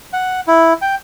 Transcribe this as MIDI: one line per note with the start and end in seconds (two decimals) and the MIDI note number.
0.13 0.41 78
0.48 0.73 64
0.82 0.95 79